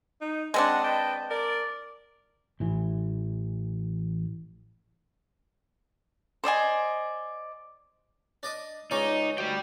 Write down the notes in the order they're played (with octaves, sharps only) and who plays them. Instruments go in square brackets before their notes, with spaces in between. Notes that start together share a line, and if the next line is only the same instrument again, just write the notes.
[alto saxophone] D#4
[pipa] G#3 C4 D4 [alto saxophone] D#5 [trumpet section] F#5
[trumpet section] B4 D#5 A5 [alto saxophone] G5
[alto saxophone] A#4 [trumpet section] D5
[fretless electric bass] A1 E3
[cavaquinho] C5 D5 D#5 G#5
[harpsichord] D4 D5 D#5
[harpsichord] C#2 C#4 D5 [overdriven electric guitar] D#4
[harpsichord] D2 [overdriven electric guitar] D5 G5